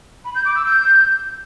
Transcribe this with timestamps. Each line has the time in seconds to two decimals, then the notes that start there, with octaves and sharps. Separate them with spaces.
0.25 B5
0.35 G6
0.45 D6
0.55 E6
0.66 G6